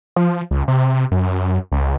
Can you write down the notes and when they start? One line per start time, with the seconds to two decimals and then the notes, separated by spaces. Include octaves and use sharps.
0.16 F3
0.51 C#2
0.68 C3
1.11 F#2
1.72 C#2